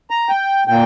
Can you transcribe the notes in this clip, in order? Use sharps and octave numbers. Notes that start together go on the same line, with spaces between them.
A#5
G5
A#2 A#3 G5